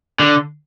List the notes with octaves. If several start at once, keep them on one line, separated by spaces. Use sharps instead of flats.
D3